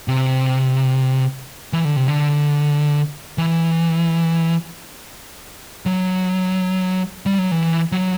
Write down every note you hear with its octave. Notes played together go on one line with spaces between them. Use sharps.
C3
E3
D3
C3
D3
E3
F#3
G3
F#3
E3
F#3